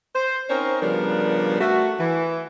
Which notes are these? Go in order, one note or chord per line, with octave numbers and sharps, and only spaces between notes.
C5
C4 C#4 D#4 A#4 C5 C#5
C#3 F3 G3 B3 D4 A#4
A3 F#4
E3